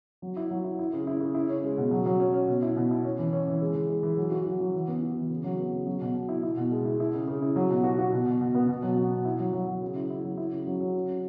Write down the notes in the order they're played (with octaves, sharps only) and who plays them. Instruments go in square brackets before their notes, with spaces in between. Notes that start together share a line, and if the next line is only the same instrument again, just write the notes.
[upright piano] F#3
E4
F#3
E4
E4
C#3
E4
C#3
E4
C#4
G#3
B2
F#3
F#3
C#4
C#4
B2
E4
B2
E4
C#4
E3
C#4
E3
G#3
E3
G#3
E3
F#3
F#4
F#3
F#3
E3
B3
F#4
E3
C#3
F#3
B3
C#3
F#3
B2
B2
E4
E4
B2
G#3
E4
E4
C#3
C#3
E4
F#3
B2
F#4
F#4
B2
B2
B2
B3
B2
F#3
F#3
B2
E4
F#3
F#3
F#3
C#3
E4
E4
F#3
E4
C#3
F#3
F#3
C#3
C#3